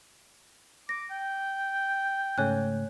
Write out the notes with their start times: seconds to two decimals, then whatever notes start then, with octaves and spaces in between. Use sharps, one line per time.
0.89 D6 A#6
1.11 G5
2.38 G#2 C#3 A3 C#5 G#5 F#6